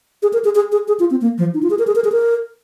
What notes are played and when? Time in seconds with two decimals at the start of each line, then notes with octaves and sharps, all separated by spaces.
0.23 G#4
0.33 A#4
0.45 G#4
0.55 G#4
0.72 G#4
0.88 G#4
1.00 F4
1.11 C4
1.22 A#3
1.38 F3
1.54 D#4
1.63 F4
1.70 G#4
1.79 A#4
1.87 G#4
1.95 A#4
2.04 G#4
2.12 A#4